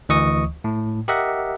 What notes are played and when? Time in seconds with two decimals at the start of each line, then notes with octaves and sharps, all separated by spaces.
0.09 D2 E3 D#5 C#6 D#6
0.64 A2
1.08 G4 A#4 D#5 E5 F#5